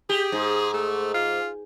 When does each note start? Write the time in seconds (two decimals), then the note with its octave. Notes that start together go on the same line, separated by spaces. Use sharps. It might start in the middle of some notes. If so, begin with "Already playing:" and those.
0.09 G4 G#4
0.32 G#2
0.74 A3
1.14 F4